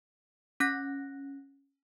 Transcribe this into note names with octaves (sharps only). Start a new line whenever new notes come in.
C#4 F#6 A#6